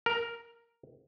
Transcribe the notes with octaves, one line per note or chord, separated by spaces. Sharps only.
A#4